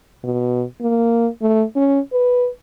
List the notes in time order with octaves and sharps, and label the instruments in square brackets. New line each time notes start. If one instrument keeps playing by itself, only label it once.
[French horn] B2
A#3
A3
C#4
B4